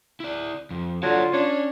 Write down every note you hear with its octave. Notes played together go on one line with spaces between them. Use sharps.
E4 D5
F2
D3 F#3 F4 C#5 A5
C#4 D4 C#5